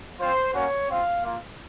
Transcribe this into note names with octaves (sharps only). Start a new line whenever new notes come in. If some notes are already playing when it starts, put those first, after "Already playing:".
C4 F4 C5
A#3 C#4 F#4 C#5
C4 F4 F5
A#3 F4